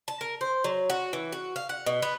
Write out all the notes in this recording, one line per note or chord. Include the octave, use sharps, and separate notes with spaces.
A5
A#4
C5
F#3
F#4
E3
F#4
F5
F#5
B2
B3